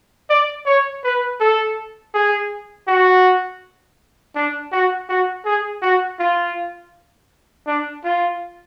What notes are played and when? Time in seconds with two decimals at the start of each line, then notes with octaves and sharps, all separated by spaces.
0.30 D5
0.66 C#5
1.04 B4
1.40 A4
2.14 G#4
2.88 F#4
4.35 D4
4.72 F#4
5.09 F#4
5.45 G#4
5.82 F#4
6.19 F4
7.67 D4
8.04 F4